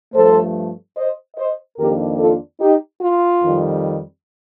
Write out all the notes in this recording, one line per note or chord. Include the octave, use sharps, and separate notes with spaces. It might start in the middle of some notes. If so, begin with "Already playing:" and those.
G2 F3 A3 A4 C5
C5 D#5
C5 D#5
F2 D#3 A#3 D4 G4 A#4
F4 A4
D#4 G4
F4
F2 D#3 G3